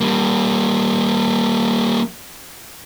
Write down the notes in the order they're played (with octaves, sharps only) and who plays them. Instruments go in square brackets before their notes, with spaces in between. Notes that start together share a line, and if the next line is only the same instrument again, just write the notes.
[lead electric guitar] G3 A#3